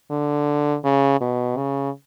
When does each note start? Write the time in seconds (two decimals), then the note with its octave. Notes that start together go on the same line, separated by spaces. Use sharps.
0.10 D3
0.84 C#3
1.21 B2
1.57 C#3